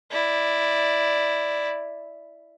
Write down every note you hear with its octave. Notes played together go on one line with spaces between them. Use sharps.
E4 D5